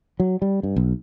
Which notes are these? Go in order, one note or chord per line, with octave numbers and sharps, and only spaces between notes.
F#3
G3
G2
B1